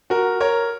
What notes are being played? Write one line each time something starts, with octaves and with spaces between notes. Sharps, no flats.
F#4 A#4
A#4 C#5